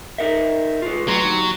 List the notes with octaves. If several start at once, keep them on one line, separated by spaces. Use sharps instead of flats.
D#4 A#4 E5
F4 G#4 B4
F#3 A3 B4 C6
D#2 D#3